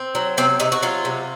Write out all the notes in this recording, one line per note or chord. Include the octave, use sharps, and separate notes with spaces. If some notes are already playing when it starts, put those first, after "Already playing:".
Already playing: C4
F#3
C3 C4
C3 D#4
F#4
F#3 F4
C3